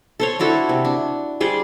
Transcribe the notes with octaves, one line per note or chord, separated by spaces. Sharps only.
A4 C5 C#5
D4 E4 F#4 A4
C3
D4
G3 G#4 C5 D5